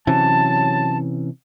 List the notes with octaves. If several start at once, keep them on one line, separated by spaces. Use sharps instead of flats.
C3 E3 F#3 C#4 A5